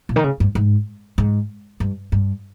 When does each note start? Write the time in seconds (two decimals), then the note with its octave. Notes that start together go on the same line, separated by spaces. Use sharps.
0.09 A#2
0.16 D#3
0.24 C#3
0.40 G2
0.55 G#2
1.18 G#2
1.80 G2
2.12 G2